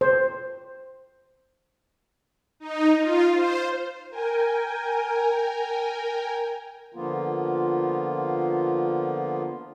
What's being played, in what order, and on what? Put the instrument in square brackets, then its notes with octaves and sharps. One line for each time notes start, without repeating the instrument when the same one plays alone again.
[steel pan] C5
[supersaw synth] D#4
F4
C5
[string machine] A#4 G5 G#5
[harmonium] D3 F3 A#3 B3 F4